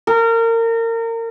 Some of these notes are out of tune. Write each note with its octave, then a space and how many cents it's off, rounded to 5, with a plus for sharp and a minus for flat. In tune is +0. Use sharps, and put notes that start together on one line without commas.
A#4 -30